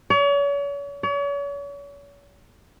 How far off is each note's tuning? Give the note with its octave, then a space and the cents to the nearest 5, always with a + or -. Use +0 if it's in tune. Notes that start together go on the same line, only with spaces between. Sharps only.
C#5 +40
C#5 +40